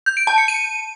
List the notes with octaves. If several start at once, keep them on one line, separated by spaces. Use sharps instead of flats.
G6
D7
A5
C#7
D#7